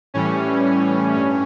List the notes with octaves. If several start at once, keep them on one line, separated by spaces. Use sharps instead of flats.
A2 E3 G3 C#4
G2